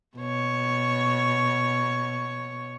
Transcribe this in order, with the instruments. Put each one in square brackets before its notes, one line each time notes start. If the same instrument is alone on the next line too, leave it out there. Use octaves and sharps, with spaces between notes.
[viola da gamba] B2 C#5